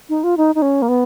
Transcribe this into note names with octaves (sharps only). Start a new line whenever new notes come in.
D#4
F4
D#4
D#4
C#4
A#3
B3